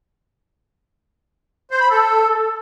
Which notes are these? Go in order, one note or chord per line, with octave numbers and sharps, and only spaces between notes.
C5
B5
A4